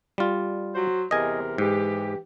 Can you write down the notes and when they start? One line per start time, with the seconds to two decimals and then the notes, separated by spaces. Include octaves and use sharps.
0.18 G3 F4
0.75 F#3 F#4 C5
1.11 E2 C3 A#4 D#5 G#5
1.58 G#2 E3 G4